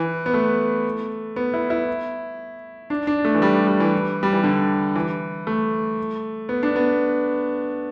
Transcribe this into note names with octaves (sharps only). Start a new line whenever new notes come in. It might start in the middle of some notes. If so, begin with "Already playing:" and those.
Already playing: E3
B3
A3
B3
E4
E4
D4
D4
A3
E3
G3
G3
E3
G3
E3
D3
E3
A3
B3
D4
B3